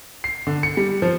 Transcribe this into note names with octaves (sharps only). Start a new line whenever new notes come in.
C7
D3
C#7
G3
F3